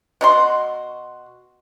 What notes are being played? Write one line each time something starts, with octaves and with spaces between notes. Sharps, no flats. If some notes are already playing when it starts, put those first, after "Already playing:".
B2 F#4 C6